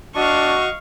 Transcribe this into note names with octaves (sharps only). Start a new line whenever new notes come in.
D4 F#4 D#5 F5 C#6